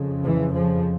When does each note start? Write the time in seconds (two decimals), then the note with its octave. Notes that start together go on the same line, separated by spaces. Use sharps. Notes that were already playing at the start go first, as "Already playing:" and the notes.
Already playing: F2 C#3
0.23 E3
0.52 F3